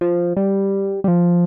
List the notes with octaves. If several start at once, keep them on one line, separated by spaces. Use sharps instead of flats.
F3
G3
G3
F3